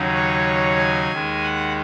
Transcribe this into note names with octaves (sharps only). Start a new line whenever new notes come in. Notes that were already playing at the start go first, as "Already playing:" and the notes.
Already playing: D#2 C#3 F#3 D#4
C#5
G#5
D#2 D#3 G#3
F#5